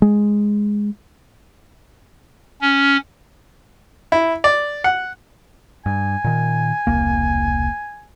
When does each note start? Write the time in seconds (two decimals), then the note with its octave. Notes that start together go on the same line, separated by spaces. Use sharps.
0.02 G#3
2.61 C#4
4.12 E4
4.44 D5
4.84 F#5
5.86 G2 G#5
6.24 A#2 D#3
6.87 E1 C2 A#3